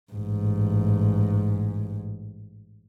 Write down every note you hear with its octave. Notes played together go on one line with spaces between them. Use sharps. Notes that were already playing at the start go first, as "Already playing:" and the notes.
A1 G#2